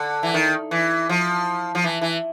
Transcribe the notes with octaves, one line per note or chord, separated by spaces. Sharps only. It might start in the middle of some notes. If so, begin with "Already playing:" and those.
Already playing: D3
E3
D#3
E3
F3
F3
E3
E3